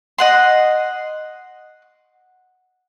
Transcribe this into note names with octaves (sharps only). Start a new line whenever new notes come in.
D#5 F#5 C6